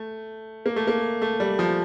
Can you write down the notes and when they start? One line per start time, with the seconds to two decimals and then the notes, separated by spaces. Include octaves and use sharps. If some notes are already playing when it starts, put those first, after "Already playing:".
Already playing: A3
0.66 A#3
0.76 A3
0.87 A#3
1.22 A3
1.40 G3
1.59 F3